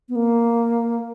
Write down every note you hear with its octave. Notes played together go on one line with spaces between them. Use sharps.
B3
A#3